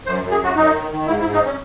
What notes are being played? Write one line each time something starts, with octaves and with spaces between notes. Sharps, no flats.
F#2 C5
F#2
G#4
F#2 F#4
F#2 D#4
D#3
D#3
G#2 E4
E4
G#2
D#4
C#4